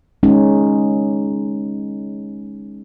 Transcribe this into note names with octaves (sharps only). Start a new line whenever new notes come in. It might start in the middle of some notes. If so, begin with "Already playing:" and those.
G#3 C#4 D#4